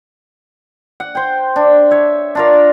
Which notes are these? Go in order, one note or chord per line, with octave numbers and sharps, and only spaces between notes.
F#5
C5 G5
D4
C#5 E5
D4 F4 A#4